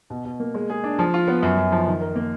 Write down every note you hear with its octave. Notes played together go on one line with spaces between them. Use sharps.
B2
B2
A#3
G#3
G#4
D4
F3
F4
B3
F#2
F#2
F3
D#3
A#4
A#3